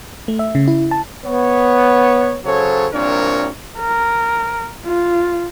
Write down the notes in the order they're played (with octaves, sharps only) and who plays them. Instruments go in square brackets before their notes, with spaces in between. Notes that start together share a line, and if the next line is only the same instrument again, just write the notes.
[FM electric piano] A3
E5
C#3
E4
A5
[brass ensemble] B3 C#5
C#3 F#3 A4 C5 C#5
C2 A#2 C4 D4 A#4 C#5
[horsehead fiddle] A#4
F4